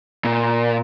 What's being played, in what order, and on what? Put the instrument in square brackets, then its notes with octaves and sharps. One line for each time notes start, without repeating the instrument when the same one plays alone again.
[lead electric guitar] A#2